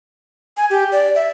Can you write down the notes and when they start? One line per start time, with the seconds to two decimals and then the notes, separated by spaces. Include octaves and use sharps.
0.57 G#5
0.70 G4
0.92 D5
1.15 E5